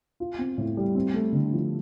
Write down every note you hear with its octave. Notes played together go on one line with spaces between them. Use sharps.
F4
C4
A2
G3
C4
A3
D3
F3